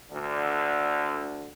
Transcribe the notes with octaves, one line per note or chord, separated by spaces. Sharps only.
D2 D3